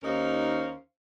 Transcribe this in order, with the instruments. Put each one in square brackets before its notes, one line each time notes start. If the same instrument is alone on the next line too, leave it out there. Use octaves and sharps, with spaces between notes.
[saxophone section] D#2 C#4 D#4 A#4 C5 F5